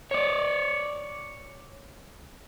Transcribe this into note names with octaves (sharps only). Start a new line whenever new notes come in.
C#5 D5